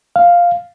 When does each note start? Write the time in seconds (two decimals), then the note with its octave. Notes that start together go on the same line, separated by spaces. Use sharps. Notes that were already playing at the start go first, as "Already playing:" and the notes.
0.16 F5